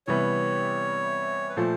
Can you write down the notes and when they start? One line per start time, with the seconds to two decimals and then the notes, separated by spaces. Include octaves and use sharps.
0.07 C3 E3 G3 B3 C#5
1.49 B4
1.56 A#2 F3 A3 C5